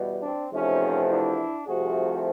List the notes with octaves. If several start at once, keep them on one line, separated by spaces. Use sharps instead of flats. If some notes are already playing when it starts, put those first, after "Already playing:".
Already playing: E2 B2 G3
C4 D4
E2 C3 F3 A3 C#4 D#4
D4 E4
C2 C3 F3 A3 F#4 G#4